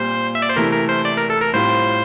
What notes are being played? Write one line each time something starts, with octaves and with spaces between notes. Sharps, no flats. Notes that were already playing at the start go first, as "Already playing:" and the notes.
Already playing: A#2 G3 C4 C5
E5
D5
C5
C3 E3 A3 A#4
A#4
C5
D5
A#4
A4
A#4
A2 G3 C4 F4 C5